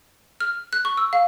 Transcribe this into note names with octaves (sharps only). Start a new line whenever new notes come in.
F6
F#6
C#6
E6
F5